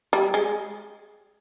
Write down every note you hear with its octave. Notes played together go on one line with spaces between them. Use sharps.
G3
G#3